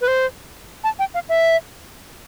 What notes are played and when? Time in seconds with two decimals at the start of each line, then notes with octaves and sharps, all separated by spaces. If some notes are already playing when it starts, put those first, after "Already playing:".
0.01 B4
0.08 C5
0.84 A5
0.99 G5
1.14 F5
1.29 E5